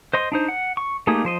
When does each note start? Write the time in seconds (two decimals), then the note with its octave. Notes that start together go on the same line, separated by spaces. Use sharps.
0.13 C5 D#5 C6
0.32 D4 D#4 C5
0.49 F#5
0.77 C#6
1.07 A3 A#3 D#4 G4 G#4
1.25 F3 C5 D#5